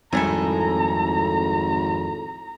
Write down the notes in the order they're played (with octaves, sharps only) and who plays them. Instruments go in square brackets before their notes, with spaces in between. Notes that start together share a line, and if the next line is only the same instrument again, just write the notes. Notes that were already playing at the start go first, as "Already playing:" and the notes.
[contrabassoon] G#1 [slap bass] F2 G3 [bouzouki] A2 G#4 A4 [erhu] A#5